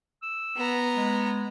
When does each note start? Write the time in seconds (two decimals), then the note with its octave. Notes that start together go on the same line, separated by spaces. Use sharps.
0.22 E6
0.56 B3 A#5
0.97 G#3